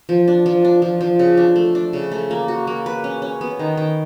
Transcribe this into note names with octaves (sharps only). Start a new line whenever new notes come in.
F3
D4
F3
D4
F3
F3
C#3
D4
A3
D4
C#3
A3
A#3
F#4
A#3
B4
C#4
C#4
B3
D#3
D#3